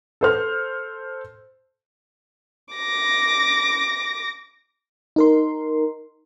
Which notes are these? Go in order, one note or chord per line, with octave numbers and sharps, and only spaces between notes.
A4 C5 F6
D6 A#6
D#4 A#4 C6